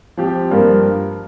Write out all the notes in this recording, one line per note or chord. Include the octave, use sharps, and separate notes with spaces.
F3 C4 G4
G2 F3 A#3 F4 A#4